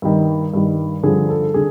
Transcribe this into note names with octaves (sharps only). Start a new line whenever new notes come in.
G2 D#3
G2 D#3
G2 D3 F3 G#4
A4
D3 G#4